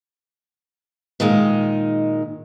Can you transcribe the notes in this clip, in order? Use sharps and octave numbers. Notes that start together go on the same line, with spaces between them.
A#2 D#3 G#3 D#4